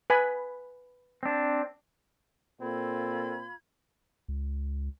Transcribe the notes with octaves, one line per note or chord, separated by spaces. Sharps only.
B4 G#5 B5
C4 D4
A#2 C4 F4 A4 B5 G#6
C#2